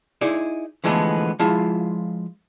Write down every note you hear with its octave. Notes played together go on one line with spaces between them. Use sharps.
D#4 E4 G#4 D5
D3 E3 F3 G#3 A3 B3
F3 G#3 E4 F4